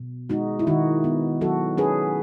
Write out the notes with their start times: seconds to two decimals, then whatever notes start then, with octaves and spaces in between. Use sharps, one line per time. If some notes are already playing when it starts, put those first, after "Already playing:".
Already playing: B2
0.30 G#3 D#4 F#4
0.59 E4
0.67 D#3 D#4 F#4
1.04 B3
1.41 F#3 F#4 A4
1.77 C#4 G#4 B4